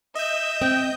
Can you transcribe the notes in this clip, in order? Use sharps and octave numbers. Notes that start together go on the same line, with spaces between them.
D#5 E5 G6
C4 G5